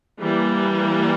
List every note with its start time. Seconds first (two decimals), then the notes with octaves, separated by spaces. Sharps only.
0.20 E3 G3 A#3